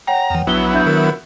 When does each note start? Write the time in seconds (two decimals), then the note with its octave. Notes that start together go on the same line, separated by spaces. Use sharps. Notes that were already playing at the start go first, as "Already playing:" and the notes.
0.07 C#5 F#5 G5 A#5
0.30 E2 E3
0.47 A#1 F#3 B3 D4 E4 G7
0.73 D4 E5 G6
0.86 D#3 A#4